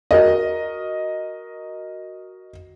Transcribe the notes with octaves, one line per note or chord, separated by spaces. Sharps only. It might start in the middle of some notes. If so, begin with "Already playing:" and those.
F#4 A#4 D#5